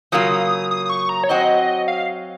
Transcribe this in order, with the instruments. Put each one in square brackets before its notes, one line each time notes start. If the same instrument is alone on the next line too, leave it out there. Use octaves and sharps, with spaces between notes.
[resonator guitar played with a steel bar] C#3 F#3 A#3 F4 [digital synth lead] D#6
[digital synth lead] D#6
D#6
C#6
A#5
C#5
[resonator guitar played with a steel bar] F#3 C4 F#4 [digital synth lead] D#5
[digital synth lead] F5